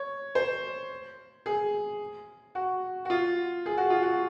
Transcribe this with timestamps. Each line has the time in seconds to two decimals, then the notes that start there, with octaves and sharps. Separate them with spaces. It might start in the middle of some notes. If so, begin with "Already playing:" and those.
Already playing: C#5
0.35 C5
1.46 G#4
2.55 F#4
3.05 F#4
3.10 F4
3.66 G#4
3.77 F#4
3.90 F4
4.03 F#4